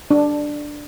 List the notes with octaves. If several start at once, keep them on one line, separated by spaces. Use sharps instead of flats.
D4